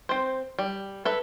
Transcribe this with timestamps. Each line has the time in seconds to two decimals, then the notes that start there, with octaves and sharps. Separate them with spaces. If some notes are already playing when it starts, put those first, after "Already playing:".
0.09 C4 C5
0.59 G3
1.05 A4 B4 E5